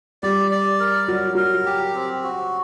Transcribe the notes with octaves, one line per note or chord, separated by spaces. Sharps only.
G3 D5
D5
A#4
F#3 A#4
F#3 A#4
G4
C4
F#4